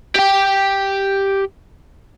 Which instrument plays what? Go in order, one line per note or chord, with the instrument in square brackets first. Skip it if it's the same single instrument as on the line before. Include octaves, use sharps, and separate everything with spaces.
[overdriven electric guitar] G4 G5